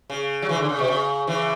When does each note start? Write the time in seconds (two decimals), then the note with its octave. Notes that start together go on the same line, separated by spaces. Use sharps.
0.10 C#3
0.42 F#3
0.49 C#3 E3
0.59 D3
0.69 C#3
0.79 B2
0.88 C#3
1.27 C#3 E3